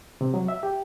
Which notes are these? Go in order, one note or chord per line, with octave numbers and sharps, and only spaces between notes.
C3
F#3
E5
G4